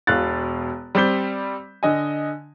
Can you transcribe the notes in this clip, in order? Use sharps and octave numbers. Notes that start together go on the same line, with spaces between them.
E1 B2 F5 F#6 A6
G3 C4 D5 G6 B6 G7
D3 D#5 G#5